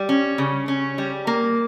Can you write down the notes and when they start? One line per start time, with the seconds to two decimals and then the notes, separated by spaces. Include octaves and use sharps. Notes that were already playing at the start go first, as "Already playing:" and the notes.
Already playing: G3
0.09 C#4
0.38 C#3
0.68 C#4
0.98 G3
1.27 A#3